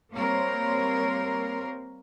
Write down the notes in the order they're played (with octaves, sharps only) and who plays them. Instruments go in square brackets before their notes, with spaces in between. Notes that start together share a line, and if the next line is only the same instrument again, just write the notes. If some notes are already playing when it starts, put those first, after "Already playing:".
[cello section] G3 A#3 C4 A#4 C5 C#5